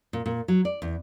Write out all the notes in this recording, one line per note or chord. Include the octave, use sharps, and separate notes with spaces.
A#2
A#2
F#3
D5
E2